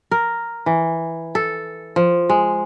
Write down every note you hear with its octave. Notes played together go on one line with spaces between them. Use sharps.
A#4
E3
A4
F3
G#3